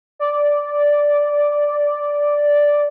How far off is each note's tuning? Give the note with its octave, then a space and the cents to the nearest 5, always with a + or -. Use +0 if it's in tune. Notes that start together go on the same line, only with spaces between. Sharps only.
D5 -5